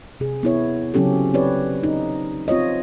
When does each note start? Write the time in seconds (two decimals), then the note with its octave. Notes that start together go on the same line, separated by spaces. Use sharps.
0.20 C3 G#4
0.43 B3 E4 C#5
0.94 C#3 F#3 C4 C#4 G4 A4
1.34 C4 G4 B4 C#5 D5
1.83 D#4
2.48 C4 F4 C#5 D#5